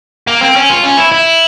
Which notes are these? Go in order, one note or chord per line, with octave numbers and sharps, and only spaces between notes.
A#3
C4
C#4
F4
C#4
E4
E4